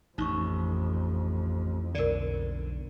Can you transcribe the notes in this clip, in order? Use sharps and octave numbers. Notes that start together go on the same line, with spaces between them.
A1 F2 D#4 C#6
B1 D3 A#4 D5